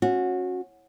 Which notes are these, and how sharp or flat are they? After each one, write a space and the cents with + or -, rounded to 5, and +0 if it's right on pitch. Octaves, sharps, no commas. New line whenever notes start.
C#4 -20 F#4 -20